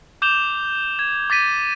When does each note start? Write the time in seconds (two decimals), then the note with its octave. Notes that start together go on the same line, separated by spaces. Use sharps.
0.22 D6 G6 E7 F7 G7
0.99 G#6
1.30 D6 A6 B6 D#7